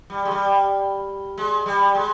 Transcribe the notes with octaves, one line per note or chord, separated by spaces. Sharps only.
G3
G#3
G3
G#3
G3
G#3